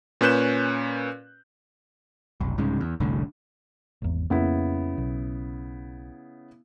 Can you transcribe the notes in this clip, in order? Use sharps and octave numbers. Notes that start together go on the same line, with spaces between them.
A#2 C#4 B4 F#6 G6 E7
F1 B1
C2 G#2 C#3
E2
F1 C2 A2 D3
G#1 E2
F2 C#3 A#3 B3 E4
B1